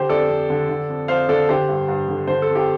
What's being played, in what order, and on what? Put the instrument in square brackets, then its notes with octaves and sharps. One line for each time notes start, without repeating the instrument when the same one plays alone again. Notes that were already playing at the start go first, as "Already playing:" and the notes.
Already playing: [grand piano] D3 G4 C5
F2 A4 D5
F2
D3
D3
F2
F2 C5 F5
D3 A4 D5
D3 G4 C5
G2
G2
D3
D3 C5
A4
F2
G4